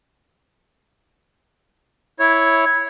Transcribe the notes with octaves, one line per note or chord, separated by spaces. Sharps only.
E4 C#5